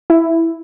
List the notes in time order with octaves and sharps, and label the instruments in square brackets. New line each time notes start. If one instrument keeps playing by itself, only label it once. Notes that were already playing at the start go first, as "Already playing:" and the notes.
[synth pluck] E4